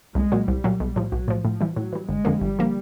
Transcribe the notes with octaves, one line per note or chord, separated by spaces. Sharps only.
C2 G#3
A#2 F#3
C2 G3
A#2 F#3
B1
A2 F3
B1 F#3
A2 F3
A2 F3
E3 G3
A2 F#3
E3 G3
G1 G#3
F2 D3 F3 A#3
G1 G3
D3 F3 A#3